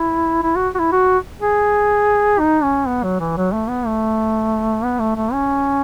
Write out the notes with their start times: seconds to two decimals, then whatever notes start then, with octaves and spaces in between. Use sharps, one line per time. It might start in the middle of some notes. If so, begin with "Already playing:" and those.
Already playing: E4
0.43 E4
0.56 F#4
0.74 F#4
0.79 E4
0.92 F#4
1.40 G#4
2.39 D#4
2.63 C#4
2.87 B3
3.03 F#3
3.20 E3
3.37 F#3
3.53 A3
3.68 B3
3.86 A3
4.84 B3
4.99 A3
5.15 A3
5.33 C#4